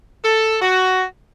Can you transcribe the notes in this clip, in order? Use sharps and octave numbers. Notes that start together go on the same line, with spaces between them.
A4
F#4